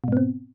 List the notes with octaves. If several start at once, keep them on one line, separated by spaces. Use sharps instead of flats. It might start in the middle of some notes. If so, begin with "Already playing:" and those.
G#2 B2 B3 C4